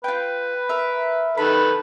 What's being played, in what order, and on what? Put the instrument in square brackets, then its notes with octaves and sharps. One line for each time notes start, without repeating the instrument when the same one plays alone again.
[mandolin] F4 G5 [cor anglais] B4
[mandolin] A#4 E5
[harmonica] D#3 A4 B4 [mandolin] B5